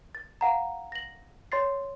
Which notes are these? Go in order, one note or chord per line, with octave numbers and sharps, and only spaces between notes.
A6
F5 F#5 A#5
A#6 F#7
C#5 C6 A6 C7